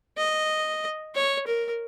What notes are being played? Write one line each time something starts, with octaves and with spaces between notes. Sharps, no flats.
D#5
C#5
A#4